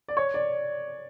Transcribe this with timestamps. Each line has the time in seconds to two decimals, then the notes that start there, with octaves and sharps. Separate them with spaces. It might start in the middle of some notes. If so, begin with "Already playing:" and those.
0.08 D5
0.17 C#5
0.34 D5